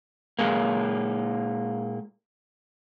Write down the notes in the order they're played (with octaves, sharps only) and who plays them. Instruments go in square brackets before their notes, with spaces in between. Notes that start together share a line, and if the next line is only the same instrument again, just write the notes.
[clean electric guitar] A#2 G#3 A#3